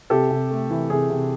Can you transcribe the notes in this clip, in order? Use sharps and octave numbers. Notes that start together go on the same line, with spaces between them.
C3 G4 A4
C3
A3
E3
C3 G#4
C3